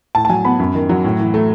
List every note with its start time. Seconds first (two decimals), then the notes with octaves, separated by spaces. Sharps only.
0.15 A2 A5
0.25 A5
0.29 F#3 G#5
0.45 B3 B5
0.59 F#2
0.74 D#3
0.89 F#3
1.04 A2
1.19 E3
1.34 A3